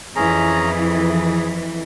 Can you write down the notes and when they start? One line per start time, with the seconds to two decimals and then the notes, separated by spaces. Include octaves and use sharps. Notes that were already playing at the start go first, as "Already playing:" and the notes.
0.16 F2 E3 C#4 G#4 A#5
0.72 G#4